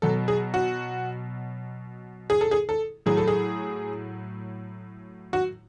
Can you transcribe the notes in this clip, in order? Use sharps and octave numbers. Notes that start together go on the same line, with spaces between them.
B2 F#3 A4
G#4
F#4
G#4
A4
G#4
A4
A2 F#3 G#4
A4
G#4
F#4